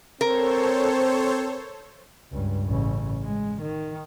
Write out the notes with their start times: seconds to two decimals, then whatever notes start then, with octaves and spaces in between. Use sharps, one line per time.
0.21 C4 A4 A#4 C5 C#5
2.32 C#2 G2
2.68 A1 C#3
3.23 G#3
3.62 D#3